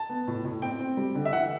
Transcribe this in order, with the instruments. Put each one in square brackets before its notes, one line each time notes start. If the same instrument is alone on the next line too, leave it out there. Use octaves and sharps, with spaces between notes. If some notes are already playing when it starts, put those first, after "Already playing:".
Already playing: [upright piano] A5
B3
A2
A2
C4 G5
C4
G3
D3
E5
E3 F#5